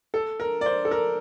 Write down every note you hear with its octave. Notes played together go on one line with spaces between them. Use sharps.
A4
A#4
D5
C5
A4
A#4